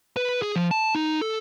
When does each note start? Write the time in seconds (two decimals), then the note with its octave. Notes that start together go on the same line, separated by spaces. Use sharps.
0.17 B4
0.42 G#4
0.56 F3
0.71 A5
0.95 D#4
1.21 A4